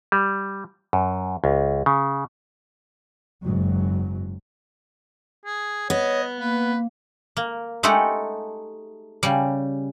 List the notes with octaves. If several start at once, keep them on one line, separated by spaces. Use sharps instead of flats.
G3
F#2
C#2
C#3
F#1 G#2 F#3
G#4
B3 C#5 D#5
A#3 B4
A#3
G#3 A3 D#4 G4 A4 F#5
C#3 G3